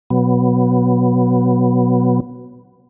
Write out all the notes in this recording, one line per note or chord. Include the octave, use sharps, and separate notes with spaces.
B2 F#3 B3